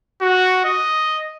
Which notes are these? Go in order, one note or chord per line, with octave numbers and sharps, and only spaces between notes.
F#4
D#5